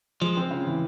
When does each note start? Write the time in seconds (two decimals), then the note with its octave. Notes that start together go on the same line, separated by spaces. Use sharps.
0.21 F3 G#3
0.37 C4
0.51 C#3
0.67 E3